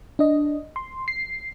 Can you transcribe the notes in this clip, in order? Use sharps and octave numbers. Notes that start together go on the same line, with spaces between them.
D4 D#5
C6
C7